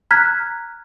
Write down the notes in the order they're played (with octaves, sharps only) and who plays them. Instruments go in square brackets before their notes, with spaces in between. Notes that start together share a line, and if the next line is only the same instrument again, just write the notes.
[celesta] A#5 F6 F#6 G#6 B6